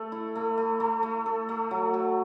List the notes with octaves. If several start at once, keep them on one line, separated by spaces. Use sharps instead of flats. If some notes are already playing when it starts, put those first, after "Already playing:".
Already playing: A3 A4
E4
A3
A3
A3
A3
A4
A3
F#3
F#3